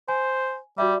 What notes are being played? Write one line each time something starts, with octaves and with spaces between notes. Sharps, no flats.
C5 G#5
G3 F#4 D5 E5